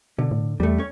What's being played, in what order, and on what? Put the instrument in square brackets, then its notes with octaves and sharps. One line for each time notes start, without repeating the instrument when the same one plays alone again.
[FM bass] B2 [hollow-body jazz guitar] D3
[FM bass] A2
[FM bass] E2 [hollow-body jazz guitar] G3 A3
[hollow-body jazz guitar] C#4 C#5